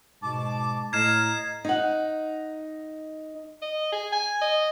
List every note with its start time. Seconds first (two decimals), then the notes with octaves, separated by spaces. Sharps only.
0.23 G#2 B2 A5 D6
0.93 A2 D#5 A#5 F6 G#6 C7 E7
1.65 D#4 F#5
3.62 D#5
3.92 G#4
4.13 G#5
4.42 D#5